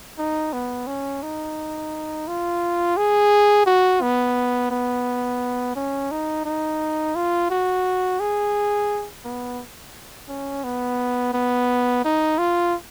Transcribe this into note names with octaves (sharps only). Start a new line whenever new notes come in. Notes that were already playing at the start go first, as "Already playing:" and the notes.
D#4
B3
C#4
D#4
F4
G#4
F#4
B3
B3
C#4
D#4
D#4
F4
F#4
G#4
B3
C#4
B3
B3
D#4
F4